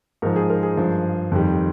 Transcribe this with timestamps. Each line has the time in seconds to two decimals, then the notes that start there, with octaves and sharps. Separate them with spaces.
0.22 G#2 F3 A#4
0.36 G#4
0.50 A#4
0.63 G#4
0.77 G2 F3
1.32 F2 D#3 G3